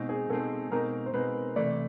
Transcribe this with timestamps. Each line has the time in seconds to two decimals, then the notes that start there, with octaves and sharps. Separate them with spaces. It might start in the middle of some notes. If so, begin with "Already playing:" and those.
Already playing: B2 G#3 C4 D#4
0.09 G#4
0.30 B2 G#3 C4 D#4 A4
0.72 B2 G#3 C4 D#4 A#4
1.06 C5
1.14 B2 G#3 C4 D#4 B4
1.56 C3 E3 A3 D5